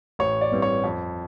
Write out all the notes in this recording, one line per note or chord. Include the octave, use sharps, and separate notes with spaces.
A1 C#5
D5
G2 E3 G3 C4
C#5
F2